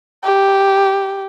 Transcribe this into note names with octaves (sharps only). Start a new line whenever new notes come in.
G4